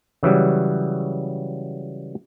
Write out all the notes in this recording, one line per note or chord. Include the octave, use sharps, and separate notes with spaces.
C#3 E3 F#3 G3